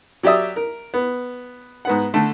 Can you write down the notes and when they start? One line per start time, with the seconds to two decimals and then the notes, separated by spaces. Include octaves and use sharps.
0.23 F#3 G4 D5 E5 D#6
0.56 A#4
0.94 B3
1.85 G#2 B3 F#5
2.14 D3 A3